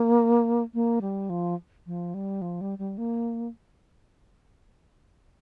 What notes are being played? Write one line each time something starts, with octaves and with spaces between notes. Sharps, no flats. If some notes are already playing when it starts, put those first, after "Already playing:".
Already playing: A#3
A#3
G3
F3
F3
G3
F3
G3
G3
A#3